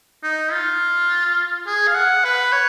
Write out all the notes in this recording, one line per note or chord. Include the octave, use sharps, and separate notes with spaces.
D#4
F4
G#4
F5
F#5
B4
C#5